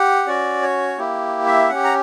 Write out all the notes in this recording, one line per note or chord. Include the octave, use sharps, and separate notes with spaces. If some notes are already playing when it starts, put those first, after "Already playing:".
Already playing: G4 F#5
C#4 F#4 D5
C#5
A#3 E4 G4
E5
C#4 G4 F#5
A#5